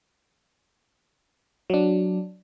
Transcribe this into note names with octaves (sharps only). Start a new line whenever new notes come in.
F#3 D4